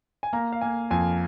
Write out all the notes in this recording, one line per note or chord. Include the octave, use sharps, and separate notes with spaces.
G#5
A#3 A#5
F5
A#3 G#5
F2 G#5